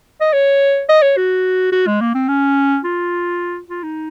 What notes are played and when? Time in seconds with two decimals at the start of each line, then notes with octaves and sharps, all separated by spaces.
0.21 D#5
0.33 C#5
0.89 D#5
1.02 C#5
1.17 F#4
1.72 F#4
1.87 G#3
2.01 A#3
2.14 C4
2.28 C#4
2.84 F4
3.69 F4
3.83 D#4